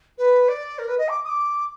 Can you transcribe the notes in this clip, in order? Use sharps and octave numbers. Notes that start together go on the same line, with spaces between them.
B4
D5
A#4
B4
D#5
D6
D#6
D6